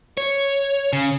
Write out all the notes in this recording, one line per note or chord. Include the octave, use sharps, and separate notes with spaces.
C#5
C#3